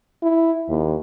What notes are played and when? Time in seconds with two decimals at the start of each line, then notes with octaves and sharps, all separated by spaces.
0.23 E4
0.69 D#2